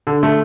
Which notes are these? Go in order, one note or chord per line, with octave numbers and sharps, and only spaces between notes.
D3
A3